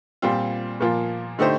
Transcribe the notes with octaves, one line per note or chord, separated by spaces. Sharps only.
A#2 G3 C4 F4
A#2 F3 A#3 F4
D3 A3 D#4 G4 C5